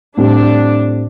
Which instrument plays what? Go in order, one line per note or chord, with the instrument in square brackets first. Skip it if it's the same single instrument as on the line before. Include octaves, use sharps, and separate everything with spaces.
[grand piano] A2 G3 C4 [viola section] D4